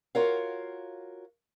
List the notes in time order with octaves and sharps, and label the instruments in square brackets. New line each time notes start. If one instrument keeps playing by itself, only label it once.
[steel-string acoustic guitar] F4 F#4 A#4 C#5 F5